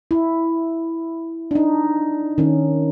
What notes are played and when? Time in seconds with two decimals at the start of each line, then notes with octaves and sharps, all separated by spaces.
0.11 E4
1.51 D4 D#4
2.38 D#3 C#4